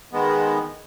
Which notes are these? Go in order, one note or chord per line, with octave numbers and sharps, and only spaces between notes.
D#3 G#3 B3